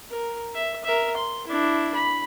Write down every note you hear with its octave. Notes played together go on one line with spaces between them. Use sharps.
A#4
E5
A#4 E5
C6
D4 E4
B5